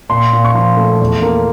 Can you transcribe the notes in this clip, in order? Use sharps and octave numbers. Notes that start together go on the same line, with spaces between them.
A#2 C6
A#2
C#6
F3 C6
A3
E2
A#3